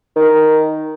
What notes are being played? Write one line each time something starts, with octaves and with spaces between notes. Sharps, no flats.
D#3